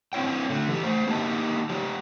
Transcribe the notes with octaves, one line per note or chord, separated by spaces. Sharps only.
C4 E4 C#5 G5
D3 A3
E3 G4
A3 C5
A#3 D#4 G4 A#4 D#5 A5
F3 G4